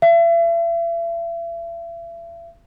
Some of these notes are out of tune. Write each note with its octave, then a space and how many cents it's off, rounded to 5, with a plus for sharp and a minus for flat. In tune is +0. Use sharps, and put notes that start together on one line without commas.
E5 +40